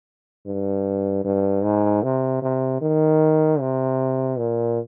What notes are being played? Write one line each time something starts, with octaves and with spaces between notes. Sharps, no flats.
G2
G2
G#2
C3
C3
D#3
C3
A#2